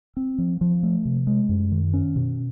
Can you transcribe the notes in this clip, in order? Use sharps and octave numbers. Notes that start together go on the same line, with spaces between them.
C4
F3
F3
A3
C3
G#3
F#2
D#3
C#4
B2